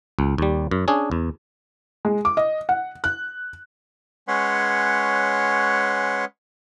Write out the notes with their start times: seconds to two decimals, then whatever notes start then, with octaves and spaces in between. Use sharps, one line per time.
0.19 C#2
0.38 D#2 G3
0.71 F#2
0.88 C#4 D4 G#4
1.12 E2
2.05 G#3
2.25 D6
2.37 D#5
2.69 F#5
3.04 F#6
4.28 G#3 C#4 B4 C#5 F#5 C6